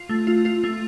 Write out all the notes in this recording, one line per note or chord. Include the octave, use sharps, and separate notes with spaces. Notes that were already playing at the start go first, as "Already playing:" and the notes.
Already playing: F4
A3
F4
F4
A3